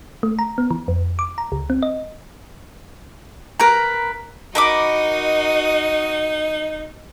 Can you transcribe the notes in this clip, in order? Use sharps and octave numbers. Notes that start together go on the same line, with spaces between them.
A3
A#5
B3
E3
F2
D6
A#5
C#2
C4
D#5
A#4 B4 A#5
D#4 F#4 A#4 D#5 B5 D6